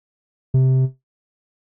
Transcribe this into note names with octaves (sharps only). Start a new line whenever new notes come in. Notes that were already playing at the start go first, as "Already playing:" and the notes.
C3